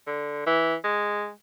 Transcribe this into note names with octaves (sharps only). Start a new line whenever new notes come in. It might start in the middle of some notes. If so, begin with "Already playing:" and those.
D3
E3
G#3